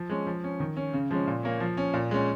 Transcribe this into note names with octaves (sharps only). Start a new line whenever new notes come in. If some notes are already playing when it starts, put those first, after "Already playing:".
Already playing: F3
G#3 C#4
F3
C#4
D#3
C#4
C#3
F3 G#3 C#4
A#2
A#3 C#4
F3
C#4
A#2
G#3 C#4